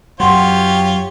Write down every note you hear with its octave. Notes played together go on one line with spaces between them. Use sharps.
F#2 F#3 F4 G4 C#5 F#5 C6